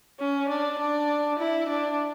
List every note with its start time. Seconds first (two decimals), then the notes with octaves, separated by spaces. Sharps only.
0.20 C#4
0.49 D4
0.79 D4
1.40 E4
1.69 D4